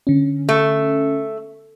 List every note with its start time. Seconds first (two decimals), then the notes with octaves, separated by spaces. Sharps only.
0.07 D3 C#4
0.49 A3